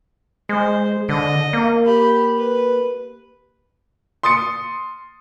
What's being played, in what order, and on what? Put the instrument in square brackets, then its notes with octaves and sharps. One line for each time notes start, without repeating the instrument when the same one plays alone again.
[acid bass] G#3 [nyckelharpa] C5
[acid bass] D3 [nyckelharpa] D#5
[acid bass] A#3
[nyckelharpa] G4 B5
B4
[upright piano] C6 D#6 A6 C#7